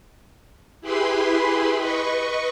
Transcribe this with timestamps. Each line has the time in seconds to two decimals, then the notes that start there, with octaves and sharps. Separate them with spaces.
0.81 E4 G4 G#4 B4 B5 C6
1.77 B4 D#5 C#6